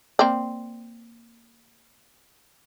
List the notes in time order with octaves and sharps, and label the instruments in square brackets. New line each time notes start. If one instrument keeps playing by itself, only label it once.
[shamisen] A#3 C4 D5